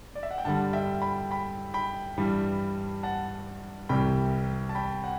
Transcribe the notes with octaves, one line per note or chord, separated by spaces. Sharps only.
D5
E5
F#5
G5
G2 D3 G3 F#5 A5
E5 G5
G5 B5
G5 B5
G5 B5
G2 E3 G3
F#5 A5
C2 C3 E3 G3 G5 B5
A5
G5 B5
F#5